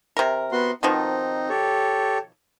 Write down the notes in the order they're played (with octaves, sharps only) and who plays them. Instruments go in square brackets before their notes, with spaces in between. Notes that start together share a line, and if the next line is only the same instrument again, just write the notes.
[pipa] C3 A#4
[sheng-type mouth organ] B3 F#4 C6
[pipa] B2 D#3 F3 [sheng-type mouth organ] C4 D#4
[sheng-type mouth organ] G4 A4 C#5